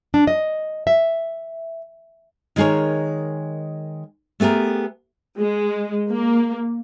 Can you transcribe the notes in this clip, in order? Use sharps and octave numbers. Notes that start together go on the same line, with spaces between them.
D4
D#5
E5
D#3 G#3 G#4 A#4 C#5
A3 B3 G4 G#4 A#4
G#3
A#3